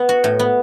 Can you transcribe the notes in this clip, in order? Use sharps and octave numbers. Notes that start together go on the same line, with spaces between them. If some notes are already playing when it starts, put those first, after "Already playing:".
Already playing: B3
F#4
A2
B3